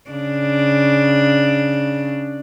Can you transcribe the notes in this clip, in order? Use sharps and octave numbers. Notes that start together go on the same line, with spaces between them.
C#3 D4